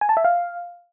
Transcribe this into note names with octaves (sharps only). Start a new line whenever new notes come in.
G#5
A5
E5
F5